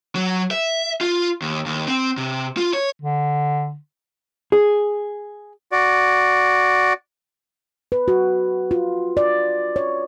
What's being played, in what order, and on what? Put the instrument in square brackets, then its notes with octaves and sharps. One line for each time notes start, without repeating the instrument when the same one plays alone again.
[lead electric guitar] F#3
E5
F4
D#2
D#2
C4
C3
F4
C#5
[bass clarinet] D3
[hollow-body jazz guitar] G#4
[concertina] F#4 D5
[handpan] B4
F#4
F4
D5
C#5